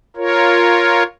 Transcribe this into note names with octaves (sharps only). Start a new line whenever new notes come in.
F4 A#4 C#5